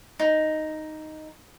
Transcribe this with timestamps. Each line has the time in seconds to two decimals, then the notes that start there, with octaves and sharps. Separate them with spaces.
0.19 D#4